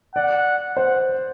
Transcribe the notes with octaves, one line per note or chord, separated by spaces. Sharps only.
D5 F#5
C5 F#5